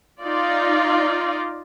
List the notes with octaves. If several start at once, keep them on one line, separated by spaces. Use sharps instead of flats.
D#4 F4 D5